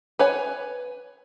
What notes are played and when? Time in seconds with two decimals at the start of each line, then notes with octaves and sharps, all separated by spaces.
0.19 B4 C#5 G#5